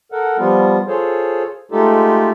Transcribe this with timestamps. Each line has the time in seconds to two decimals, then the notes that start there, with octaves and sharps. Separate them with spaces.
0.12 A4 A#4 F#5
0.38 F3 G3 B3 F4
0.88 F4 G#4 A4 C5 C#5
1.72 G#3 A3 D#4 F4 G4 A4